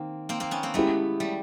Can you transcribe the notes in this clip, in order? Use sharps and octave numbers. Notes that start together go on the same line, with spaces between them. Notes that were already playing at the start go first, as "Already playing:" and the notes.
Already playing: D#3 A#3 C4
A#3 C4
A#3 C4
B3 C#4
A#3 C4
G#3 A3 B3 C#4 E4 G4
G3 A3